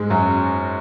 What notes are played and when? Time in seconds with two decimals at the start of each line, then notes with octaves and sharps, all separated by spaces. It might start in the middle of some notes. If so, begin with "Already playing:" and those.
Already playing: G#2 G#3
0.10 F#2 F#3